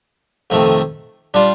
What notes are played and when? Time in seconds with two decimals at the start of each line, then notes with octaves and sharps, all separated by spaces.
0.50 F2 C3 D#3 A3
1.34 G3 D4 F4